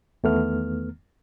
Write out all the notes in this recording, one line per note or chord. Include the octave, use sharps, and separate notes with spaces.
E2 D#3 A3 B3 F6